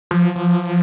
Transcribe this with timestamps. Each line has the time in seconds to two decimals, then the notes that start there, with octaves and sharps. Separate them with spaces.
0.11 F3
0.35 F3